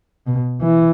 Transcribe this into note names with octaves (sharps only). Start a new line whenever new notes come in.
B2
E3